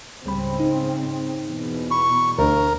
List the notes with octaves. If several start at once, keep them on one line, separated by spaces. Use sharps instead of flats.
C#2 G#2 C#3 G3 C4 B5
D#4
E2 B2
B5 C#6
D2 A3 D4 A#4